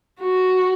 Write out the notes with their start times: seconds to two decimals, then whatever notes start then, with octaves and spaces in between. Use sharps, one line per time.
0.20 F#4